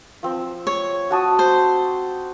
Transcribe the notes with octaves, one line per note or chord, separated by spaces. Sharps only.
F3 C4
C#5
F#4 A5 D#6
C5